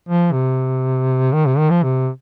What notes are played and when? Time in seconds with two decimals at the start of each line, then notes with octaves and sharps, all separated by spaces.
0.08 F3
0.32 C3
1.32 D#3
1.46 C3
1.58 D#3
1.70 F3
1.83 C3